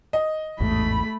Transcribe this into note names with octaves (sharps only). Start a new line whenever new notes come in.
D#5
A1 E2 G#2 A3 B5